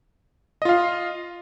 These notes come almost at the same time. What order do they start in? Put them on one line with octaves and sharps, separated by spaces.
D#5 F4 F5